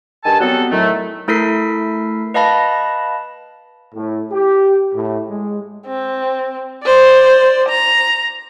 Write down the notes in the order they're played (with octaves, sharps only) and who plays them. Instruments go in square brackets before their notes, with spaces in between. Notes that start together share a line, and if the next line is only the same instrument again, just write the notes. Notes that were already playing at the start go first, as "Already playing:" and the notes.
[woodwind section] G2 D#3 G#5 A5
F#3 G3 B3 C4 A4 F#5
A2 D#3 F#3 A3
[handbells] A3 E4 A4 A#4 B6 C7
B4 D#5 F5 A5 B5 A#6
[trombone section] A2
G4
A2
G#3
[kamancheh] C4
C5 D5
A#5